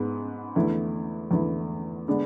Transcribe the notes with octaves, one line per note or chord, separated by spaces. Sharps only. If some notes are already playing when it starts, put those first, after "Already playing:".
Already playing: G#2 G#3 B3
E2 D3 A3 E4
E2 D3 A3 E4
D3 G#3 B3 D4